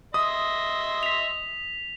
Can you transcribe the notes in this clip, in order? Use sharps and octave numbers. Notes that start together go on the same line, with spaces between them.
D#5 E5 C6 D#6
B6 F7